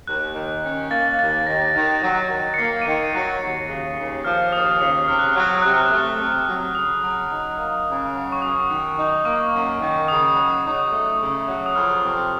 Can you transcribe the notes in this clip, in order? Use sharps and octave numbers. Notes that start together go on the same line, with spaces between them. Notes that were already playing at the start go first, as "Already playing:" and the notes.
D#2 F#6
D#3
C#4
A#3 A6
D#2 A6
D#3 A#6
D#3
F#3
D#3
C#7
A#3 C7
D#7
D#3 C#7
F#3 C#7
D#2
C#3
D#2
F3 F6
D#2 D#6
C#3 D#6
C3 F6
F#6
F6
F#3 F#6
F6
C3 F#6
F6
F#6
A3 F6
C3
F#3
C#3 D#6
F#3
D#4
A#3
C#3
F#3
C#6
F#2 D#6
D#3
D#4
A#3 C#6
F#2
D#3
C#3 D#6
F#3
D#4
A3
C#3
F#3
D#6
F2 F6
C3